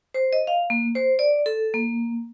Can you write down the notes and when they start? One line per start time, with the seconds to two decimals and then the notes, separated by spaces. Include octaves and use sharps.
0.14 C5
0.33 D#5
0.47 F5
0.70 A#3
0.95 C5
1.19 D5
1.46 A4
1.74 A#3